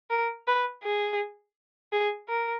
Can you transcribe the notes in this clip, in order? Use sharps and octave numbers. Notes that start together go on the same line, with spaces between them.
A#4
B4
G#4
G#4
A#4